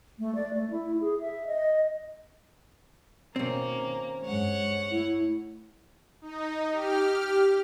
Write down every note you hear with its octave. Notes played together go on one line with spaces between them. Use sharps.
A3
D5
A3
E4
G#4
E5
D#5
B2 D#3 A#3 C4 C#4
G2 G#3 C#5 F#5
A3 E4
D#4
G4 F6